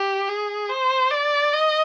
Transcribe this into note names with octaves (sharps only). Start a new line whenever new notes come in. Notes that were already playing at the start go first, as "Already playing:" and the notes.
Already playing: G4
G#4
C5
D5
D#5